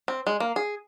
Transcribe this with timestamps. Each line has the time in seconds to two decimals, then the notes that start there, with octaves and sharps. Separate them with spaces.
0.08 C4
0.27 G#3
0.40 A#3
0.56 G#4